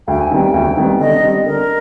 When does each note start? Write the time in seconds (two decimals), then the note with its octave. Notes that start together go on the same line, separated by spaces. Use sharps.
0.08 D2 G5
0.21 G#5
0.31 C3 D#3 G3 B3 G5
0.53 D2
0.77 C3 D#3 G3 B3
1.00 D3 D#5
1.22 G3 C4
1.45 D3 A#4